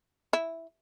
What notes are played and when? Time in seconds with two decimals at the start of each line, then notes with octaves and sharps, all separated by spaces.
0.33 E4